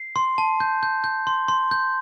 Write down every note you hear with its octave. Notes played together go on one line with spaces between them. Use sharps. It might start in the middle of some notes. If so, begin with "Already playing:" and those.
Already playing: C7
C6
A5
G6
G6
G6
C6
C6
G6